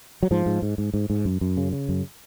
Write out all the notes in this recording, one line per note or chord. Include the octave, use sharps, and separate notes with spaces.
F#3
G#2 F3
G#2
G#2
G#2
G#2
G#2
F#2
F#2
C#3
C#3
F#2